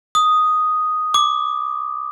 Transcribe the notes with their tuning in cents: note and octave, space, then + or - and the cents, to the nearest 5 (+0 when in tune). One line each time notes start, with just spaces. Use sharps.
D#6 +0
D6 +5